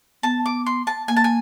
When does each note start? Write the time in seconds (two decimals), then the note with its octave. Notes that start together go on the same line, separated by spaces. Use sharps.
0.23 B3 A5
0.46 D6
0.66 C6
0.87 A5
1.08 A#3 G#5
1.16 A5
1.24 G#5